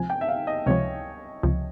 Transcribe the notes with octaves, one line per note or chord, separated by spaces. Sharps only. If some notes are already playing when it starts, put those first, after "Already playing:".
Already playing: C#2 C3 F3 G#5
G5
E5
F5
D#5
C#2 C3 F3 C#5
C#2 C3 F3